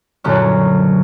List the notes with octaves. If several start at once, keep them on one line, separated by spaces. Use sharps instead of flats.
F#2 A#2 D3 C#4